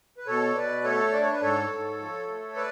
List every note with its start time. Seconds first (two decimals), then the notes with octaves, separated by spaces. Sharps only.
0.18 B4
0.27 B2 A4 C#5
0.55 B2 B4 D5
0.84 A3 A4 C#5
1.13 D4 D5
1.22 C#5
1.32 B4
1.41 G#2 A4 C#5
1.70 G#2
1.99 F3
2.28 A3
2.56 B4 D5